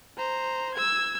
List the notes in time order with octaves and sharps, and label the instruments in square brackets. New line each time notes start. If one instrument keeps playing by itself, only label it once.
[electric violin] C5 A#5
E6 G#6